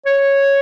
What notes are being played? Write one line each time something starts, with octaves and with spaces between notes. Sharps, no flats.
C#5